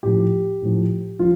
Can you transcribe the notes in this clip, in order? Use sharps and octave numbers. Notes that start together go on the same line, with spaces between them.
A2 F3 G4
A2 F3
F3 F4